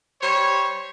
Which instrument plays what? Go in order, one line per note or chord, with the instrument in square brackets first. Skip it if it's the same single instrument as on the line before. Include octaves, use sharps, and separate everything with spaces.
[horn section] G3 C5 C#5